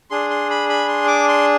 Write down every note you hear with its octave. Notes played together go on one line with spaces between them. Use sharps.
D4 G#4 C6
C6
B5
B5
C6
D6
C6